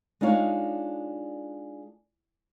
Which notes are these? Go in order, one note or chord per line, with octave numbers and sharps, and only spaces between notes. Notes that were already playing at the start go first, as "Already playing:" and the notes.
G#3 D4 D#4 F4 C#5 D5